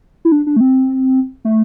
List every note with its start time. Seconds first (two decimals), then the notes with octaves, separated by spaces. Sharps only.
0.25 E4
0.32 D4
0.47 D4
0.56 A3
0.60 C4
1.45 A3